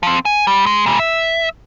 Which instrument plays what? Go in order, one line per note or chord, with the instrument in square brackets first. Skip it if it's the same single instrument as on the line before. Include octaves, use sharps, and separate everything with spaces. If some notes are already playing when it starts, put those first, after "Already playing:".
[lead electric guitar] F3 C4
G#5
G3
G#3
A#2 G3
E5